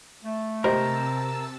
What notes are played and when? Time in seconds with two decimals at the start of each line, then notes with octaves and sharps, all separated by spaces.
0.24 A3
0.64 C3 G4 A#4 C5 D#5 A5 E6